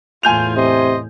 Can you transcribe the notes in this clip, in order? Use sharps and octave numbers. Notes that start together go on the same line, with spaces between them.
E2 A2 F4 G#5 G6 F7
C3 D#5 C6